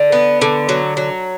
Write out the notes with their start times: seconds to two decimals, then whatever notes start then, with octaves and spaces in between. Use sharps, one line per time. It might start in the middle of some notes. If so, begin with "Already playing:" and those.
Already playing: D3
0.12 B3
0.42 D3
0.69 F#3
0.97 F#3